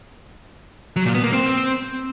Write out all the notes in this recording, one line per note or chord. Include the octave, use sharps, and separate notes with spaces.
F#3
A#2
B3
A#3
C4